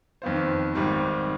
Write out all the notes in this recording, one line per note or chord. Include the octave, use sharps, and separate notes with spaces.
F2 D#3 B3 F4 C5
G#1 G#2 D#3 G3 C4